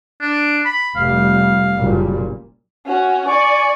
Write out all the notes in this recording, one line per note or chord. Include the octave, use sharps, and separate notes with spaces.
D4
B5
F1 G3 F5
F#1 A#2 G3
C#4 F#4
D5 G#5 C#6